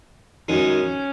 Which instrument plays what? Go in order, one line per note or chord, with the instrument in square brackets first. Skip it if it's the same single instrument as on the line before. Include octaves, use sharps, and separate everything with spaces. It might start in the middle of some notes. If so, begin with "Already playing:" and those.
[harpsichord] F#2 D#3 G#3 D#4 [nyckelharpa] C#4